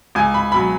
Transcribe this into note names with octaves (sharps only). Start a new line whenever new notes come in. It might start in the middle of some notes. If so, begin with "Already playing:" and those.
C#2 G#5
B5
B2 F#3 B5